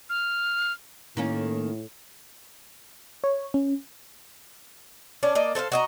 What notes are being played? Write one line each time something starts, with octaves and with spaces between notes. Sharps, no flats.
F6
A2 D#3 A#3 C#4
C#5
C#4
C#4 D4 D5
A#3 D5 D#5
A4 C5 E5 F5
F#4 D#5 A#5